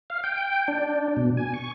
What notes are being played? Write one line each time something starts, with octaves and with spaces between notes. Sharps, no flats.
F5
G5
D4
B2
G#5
C#6